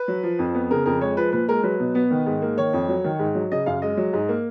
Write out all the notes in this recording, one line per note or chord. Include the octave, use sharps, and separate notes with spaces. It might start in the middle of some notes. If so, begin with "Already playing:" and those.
Already playing: B4
F#3
F3
F2
B3
C#3 A#4
F2 A#4
G#3 C#5
F3 B4
A#2 B4
G#3 A#4
F#3 B4
B2
B3
D#3
G#2
A#3
D#3 C#5
F2
F#3
D#3
G#2
F#3
C#3 D#5
F#2 F5
G#3 D#5
F#3
G#2
A#3